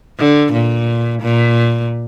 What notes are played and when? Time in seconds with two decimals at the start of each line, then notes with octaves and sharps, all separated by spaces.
0.19 D3
0.53 A#2
1.22 A#2